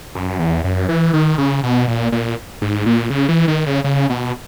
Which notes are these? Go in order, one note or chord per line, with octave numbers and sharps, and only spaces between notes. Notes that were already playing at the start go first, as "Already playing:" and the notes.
F#2
E2
F#2
E3
D#3
C#3
B2
A#2
A#2
G#2
A#2
C#3
E3
D#3
C#3
C#3
B2